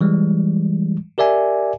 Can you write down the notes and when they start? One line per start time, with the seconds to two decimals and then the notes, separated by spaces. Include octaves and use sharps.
0.01 E3 G3 G#3
1.18 G4 A#4 D5 E5 G#5